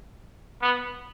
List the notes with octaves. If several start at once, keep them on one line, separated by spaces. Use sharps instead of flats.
B3